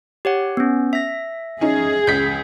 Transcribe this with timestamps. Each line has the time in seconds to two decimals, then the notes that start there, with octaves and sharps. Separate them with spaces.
0.25 G4 C#5 F#5
0.57 B3 C#4
0.93 E5 A#6
1.61 C#4 D#4 G#4
2.07 C#2 G6 B6